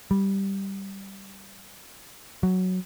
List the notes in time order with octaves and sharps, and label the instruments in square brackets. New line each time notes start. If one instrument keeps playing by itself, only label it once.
[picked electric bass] G3
F#3